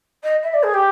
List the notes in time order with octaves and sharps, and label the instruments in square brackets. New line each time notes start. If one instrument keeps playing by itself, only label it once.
[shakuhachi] D#5
E5
D5
G#4
G4